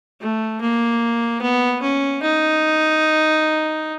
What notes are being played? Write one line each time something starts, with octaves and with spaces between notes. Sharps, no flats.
A3
A#3
B3
C#4
D#4